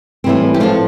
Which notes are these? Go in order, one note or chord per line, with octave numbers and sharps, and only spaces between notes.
A2 E3 G3 C4
G4
A2 F3 A3 C4 F4